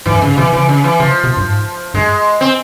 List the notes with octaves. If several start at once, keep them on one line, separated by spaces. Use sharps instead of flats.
G#2 E3
G2
G#2 C#3
C3 E3
C#3 E3
C#3
E3
C#3 F3
C3
G2
G#2
G2 G#3
C4